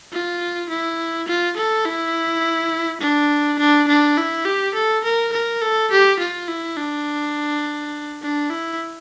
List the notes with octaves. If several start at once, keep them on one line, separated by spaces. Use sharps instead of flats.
F4
E4
F4
A4
E4
D4
D4
D4
E4
G4
A4
A#4
A#4
A4
G4
F4
E4
D4
D4
E4